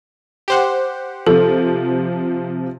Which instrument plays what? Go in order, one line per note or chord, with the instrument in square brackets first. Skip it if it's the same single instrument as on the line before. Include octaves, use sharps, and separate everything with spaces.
[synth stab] G4 C5 F#5
[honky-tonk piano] C3 F3 [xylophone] A4